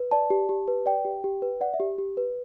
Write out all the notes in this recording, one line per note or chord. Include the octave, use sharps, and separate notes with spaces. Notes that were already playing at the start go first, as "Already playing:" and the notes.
Already playing: B4
D5 A5
G4
G4
B4
D5 G5
G4
G4
B4
D5 F#5
E5
G4
G4
B4